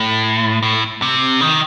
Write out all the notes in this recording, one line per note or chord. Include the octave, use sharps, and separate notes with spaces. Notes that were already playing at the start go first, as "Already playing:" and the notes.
Already playing: A2
A2
C3
D#3